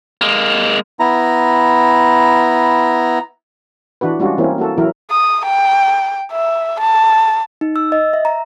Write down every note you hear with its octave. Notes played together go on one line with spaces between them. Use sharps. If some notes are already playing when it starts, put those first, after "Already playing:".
G#3 A#3
B3 E4 A#5
E3 D4 F#4 B4
G3 G#3 C#4 D4 F4 F#4
E3 A#3 C4 C#4 E4
A#3 F#4 A4
E3 F#3 E4 A#4
D#6
G5
E5
A5
D#4
E6
D#5
E5
A#5